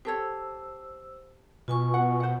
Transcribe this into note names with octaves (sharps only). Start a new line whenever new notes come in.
G4 A4 C5 C#5 E6
B2 F4 G#5 C#6
F#5
C5 F#5